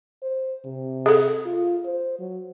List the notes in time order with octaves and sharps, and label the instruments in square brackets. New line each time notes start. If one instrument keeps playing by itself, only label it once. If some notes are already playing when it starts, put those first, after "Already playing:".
[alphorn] C5
C3
[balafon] G#4 A4
[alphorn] F4
C5
F#3